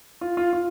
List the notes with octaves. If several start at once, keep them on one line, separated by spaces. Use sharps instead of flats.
F4
F4
F4